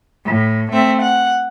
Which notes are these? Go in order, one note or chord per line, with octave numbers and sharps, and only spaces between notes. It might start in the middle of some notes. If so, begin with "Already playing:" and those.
A2
A3 C4 E5
F#5